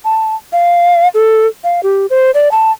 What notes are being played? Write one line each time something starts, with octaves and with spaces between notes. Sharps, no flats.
A5
F5
A4
F5
G4
C5
D5
A5